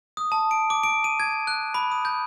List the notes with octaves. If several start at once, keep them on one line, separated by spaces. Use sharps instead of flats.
D#6
A5
D7
D6
D7
D#7
G#6
F#6
B5
D#6
G6